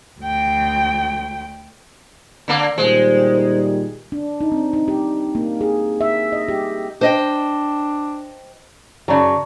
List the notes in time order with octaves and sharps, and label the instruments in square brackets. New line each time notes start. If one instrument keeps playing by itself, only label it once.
[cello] D2 G5
[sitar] D3 A#3
[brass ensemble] A#2 D#3 G3 [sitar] G#3 [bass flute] C5
[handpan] D4
D#4
C4
D#4
G4
A#3
G#4
E5
D#5
G4
[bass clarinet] D4 [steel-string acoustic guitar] C5 D#5 G5
[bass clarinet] F#2 [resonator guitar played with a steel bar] C#3 F#3 [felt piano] D5 A5 A#5